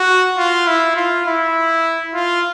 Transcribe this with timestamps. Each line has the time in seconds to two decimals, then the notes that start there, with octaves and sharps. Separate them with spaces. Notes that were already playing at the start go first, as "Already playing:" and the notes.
Already playing: F#4
0.37 F4
0.67 E4
0.96 F4
1.26 E4
2.14 F4